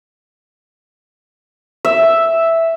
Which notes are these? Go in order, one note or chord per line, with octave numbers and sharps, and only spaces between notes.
E5